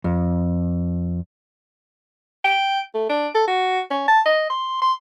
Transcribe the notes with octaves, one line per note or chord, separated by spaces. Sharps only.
F2
G5
A3
D4
A4
F#4
C#4
A5
D#5
C6
C6